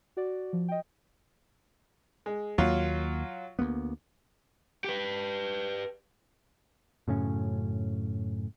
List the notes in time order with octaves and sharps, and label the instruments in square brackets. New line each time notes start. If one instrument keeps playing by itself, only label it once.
[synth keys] F#4 D5
F3
D#5 G5
[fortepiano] G#3
[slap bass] D#2 A#3 [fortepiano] F#3 F4
[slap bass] D2 A#3 B3
[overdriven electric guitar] G4 B4
[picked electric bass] F#2 A2 C#3 C#4